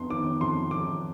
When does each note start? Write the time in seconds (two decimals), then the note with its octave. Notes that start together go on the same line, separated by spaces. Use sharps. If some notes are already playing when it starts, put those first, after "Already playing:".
Already playing: F2 B3 C6
0.10 D#3 D6
0.41 F2 C6
0.71 F2 D6